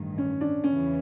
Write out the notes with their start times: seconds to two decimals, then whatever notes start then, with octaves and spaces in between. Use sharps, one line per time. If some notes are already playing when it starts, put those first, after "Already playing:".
Already playing: A1 G2 D#3
0.18 C#4
0.41 D4
0.64 E2 C#3 E3 C#4